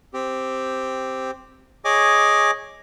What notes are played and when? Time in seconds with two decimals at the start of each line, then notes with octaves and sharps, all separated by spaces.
0.14 C4 G4
1.85 G#4 C#5 D#5 G#5 D6